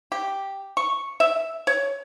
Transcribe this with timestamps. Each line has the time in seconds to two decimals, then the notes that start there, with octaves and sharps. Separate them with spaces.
0.12 G4
0.77 C#6
1.20 E5
1.67 C#5